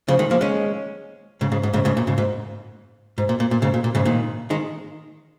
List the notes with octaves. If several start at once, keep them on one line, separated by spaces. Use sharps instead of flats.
C#3 F3
D#3 G#3
F3 A#3
G#3 C#4
G#2 C#3
G#2 C#3
G#2
G#2 C#3
G#2 C#3
A#2
G#2 C#3
G#2
G#2
A#2
A#2
A#2
G#2 C#3
A#2
A#2
G#2 C#3
A#2 D#3
D#3 G#3